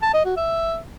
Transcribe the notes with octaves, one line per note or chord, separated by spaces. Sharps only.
A5
D#5
F#4
E5